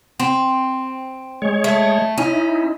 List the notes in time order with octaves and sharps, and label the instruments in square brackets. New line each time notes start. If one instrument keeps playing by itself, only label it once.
[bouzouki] C4
[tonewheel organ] G#3 C#5
[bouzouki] A3
[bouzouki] C#4 [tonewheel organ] D#4 E4